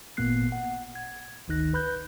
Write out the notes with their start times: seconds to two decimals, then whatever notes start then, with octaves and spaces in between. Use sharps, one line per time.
0.17 G#1 A#2 A#3 B3 F#6 C7
0.52 F#5
0.95 G#6
1.48 G1 D2 D#3 D#4 F#6 A#6
1.73 B4 B5 F#6 G6